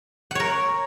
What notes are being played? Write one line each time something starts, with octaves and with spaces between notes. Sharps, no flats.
A#4 C#5 F#5